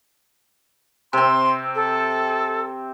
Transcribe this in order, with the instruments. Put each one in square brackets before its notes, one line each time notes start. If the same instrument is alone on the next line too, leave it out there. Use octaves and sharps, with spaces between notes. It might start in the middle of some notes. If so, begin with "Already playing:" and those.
[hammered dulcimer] C3 C4 [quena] C6
[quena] A4